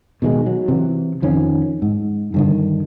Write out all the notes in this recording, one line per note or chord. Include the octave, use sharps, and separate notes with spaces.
B2 D#3 G3 G#3
F#3
C3 E3
F2 D#3 F3 C#4
G#2
G2 D3 D#3